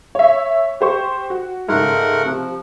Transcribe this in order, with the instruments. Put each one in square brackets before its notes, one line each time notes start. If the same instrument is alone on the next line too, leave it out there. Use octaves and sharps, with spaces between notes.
[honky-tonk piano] C#5 E5
G4 C5 C#6
F#4
[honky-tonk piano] G#2 C#3 [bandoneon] A3 A#4 F#5
[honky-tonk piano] C3 [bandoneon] F3